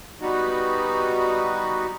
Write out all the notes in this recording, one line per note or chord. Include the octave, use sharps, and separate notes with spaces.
G3 B3 D#4 F#4